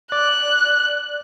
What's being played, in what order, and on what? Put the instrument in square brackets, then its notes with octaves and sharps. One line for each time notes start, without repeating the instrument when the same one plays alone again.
[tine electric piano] D5 [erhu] F#6